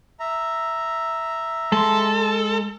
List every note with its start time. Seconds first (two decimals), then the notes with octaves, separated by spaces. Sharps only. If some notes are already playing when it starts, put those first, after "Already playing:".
0.20 E5 A#5
1.72 G#3 A4 C6